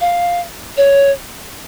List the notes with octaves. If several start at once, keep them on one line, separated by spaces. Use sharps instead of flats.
F5
C#5